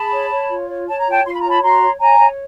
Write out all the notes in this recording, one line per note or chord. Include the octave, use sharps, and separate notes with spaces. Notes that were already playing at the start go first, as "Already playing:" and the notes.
Already playing: G#4 A5 B5
C#5
C#5
F4
C#5
C#5 A5
A#5
F4 G5 A5
F4 C6
B5
C#5 A#5
A5 B5
F#4 A#5 C6
C#5
C#5 G#5 A#5
C#5